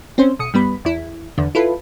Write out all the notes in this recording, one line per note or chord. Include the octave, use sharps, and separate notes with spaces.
C4 C#4 C5
B1 D#6 C#7
G2 G3 B3 B5
E2 E4
E2 D3
E4 F4 A4 B4